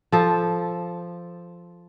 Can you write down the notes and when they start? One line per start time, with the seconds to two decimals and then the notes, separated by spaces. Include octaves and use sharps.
0.12 F3 A4